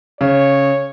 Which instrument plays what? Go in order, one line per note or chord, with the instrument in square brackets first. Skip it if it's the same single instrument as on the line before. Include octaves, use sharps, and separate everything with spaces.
[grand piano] C#3 [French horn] C#5